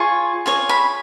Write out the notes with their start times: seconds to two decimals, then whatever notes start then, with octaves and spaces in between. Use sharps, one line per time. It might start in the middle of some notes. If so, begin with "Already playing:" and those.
Already playing: F4 G#4 C#5
0.46 F4 G#4 C#5
0.69 B5